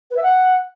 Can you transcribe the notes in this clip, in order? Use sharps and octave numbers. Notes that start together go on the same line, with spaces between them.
B4
E5
F#5